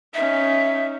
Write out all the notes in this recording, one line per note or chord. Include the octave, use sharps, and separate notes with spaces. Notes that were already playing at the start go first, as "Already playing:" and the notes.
C#4 D#4 E5